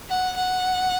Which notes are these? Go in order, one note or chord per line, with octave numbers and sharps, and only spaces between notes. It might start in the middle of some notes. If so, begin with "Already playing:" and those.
F#5
F#5